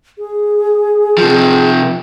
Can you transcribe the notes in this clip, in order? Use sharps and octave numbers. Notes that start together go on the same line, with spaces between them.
G#4
C3 F3